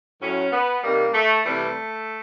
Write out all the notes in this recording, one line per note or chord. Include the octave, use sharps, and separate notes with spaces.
A2 F#3 C#4
B3
C3 D#3 G3 A#3
A3
C3 E3 G3 A3